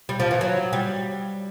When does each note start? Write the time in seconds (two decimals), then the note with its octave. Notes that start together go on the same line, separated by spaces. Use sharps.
0.09 G3
0.20 F3
0.31 E3
0.41 F#3
0.73 G3